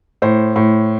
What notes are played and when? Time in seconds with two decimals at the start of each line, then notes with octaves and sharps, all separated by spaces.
0.22 A2 C5
0.56 A2